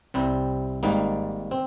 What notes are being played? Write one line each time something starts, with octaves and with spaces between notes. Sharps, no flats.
C2 C3 G3 C4
G#1 G#2 G3 A#3 D#4
C4